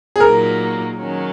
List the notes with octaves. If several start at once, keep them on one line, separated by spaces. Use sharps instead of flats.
G#4
A#2 F#3 A#3 D#4 A#4
D#3 F#3 C#4